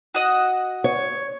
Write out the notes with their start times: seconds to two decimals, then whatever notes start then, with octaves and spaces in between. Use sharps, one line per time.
0.15 F#4 D#5 F#5
0.84 C#5